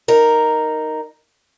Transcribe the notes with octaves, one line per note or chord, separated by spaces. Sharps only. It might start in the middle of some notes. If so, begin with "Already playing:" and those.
D#4 A#4